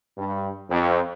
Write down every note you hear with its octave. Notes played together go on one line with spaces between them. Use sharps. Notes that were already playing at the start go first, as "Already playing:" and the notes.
G2
F2